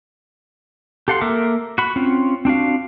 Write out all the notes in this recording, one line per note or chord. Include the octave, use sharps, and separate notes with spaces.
G4 A4 F5 F#5 C6
A#3 A4 A#4 E5 D6
F#4 B5
C4 C#4 F4
C4 D4 F#4 F5